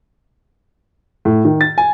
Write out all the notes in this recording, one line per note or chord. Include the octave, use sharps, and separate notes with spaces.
A2
D#3
A6
G#5